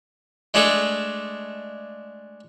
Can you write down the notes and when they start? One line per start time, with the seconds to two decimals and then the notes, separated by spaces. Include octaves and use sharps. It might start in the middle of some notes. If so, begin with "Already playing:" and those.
0.54 G#3 A3 D4 G#4 A4